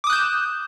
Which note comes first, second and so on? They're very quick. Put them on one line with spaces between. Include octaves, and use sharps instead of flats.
D6 D#6 F#6 G6 E7